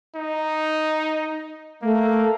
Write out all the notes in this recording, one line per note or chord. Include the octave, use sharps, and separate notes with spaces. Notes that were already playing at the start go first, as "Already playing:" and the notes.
D#4
A3 A#3